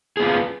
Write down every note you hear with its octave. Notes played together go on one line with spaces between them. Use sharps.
B3 F4 G#4